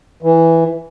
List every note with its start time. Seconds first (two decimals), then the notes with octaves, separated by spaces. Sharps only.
0.23 E3